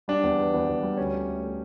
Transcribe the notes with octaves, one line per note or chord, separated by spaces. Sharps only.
G3 D4
E2
E3
E2
E2
G3
D2 C#4
A3
A3
A3